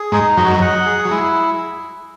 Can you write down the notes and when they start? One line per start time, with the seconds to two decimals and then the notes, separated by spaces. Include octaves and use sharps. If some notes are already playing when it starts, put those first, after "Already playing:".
Already playing: G#4
0.12 G#2 G#3 D#4
0.37 F#2 F#3 D#5
0.61 F#5
0.86 G#4
1.05 F#3
1.11 G#3 E4